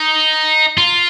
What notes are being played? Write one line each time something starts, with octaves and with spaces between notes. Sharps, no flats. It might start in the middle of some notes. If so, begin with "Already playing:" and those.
Already playing: D#4
F4